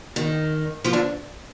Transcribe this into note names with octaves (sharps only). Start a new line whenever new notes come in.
D#3 D#4
F3 F4
D3 D4